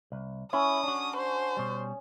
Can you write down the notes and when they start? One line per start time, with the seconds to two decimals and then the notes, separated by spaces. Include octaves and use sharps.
0.12 C2
0.53 C#4 E4 D#6
0.84 D4 F#4
1.17 C5
1.57 B2 G3